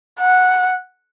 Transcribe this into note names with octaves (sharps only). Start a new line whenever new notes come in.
F#5